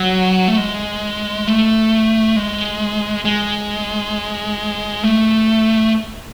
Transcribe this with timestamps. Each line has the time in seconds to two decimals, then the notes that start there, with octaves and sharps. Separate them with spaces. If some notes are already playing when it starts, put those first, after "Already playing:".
Already playing: F#3
0.48 A3
0.57 G#3
1.47 A3
2.36 G#3
3.25 G#3
5.03 A3